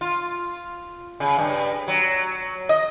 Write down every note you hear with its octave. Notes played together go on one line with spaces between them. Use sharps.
F4
C#3
G2
F#3
D#5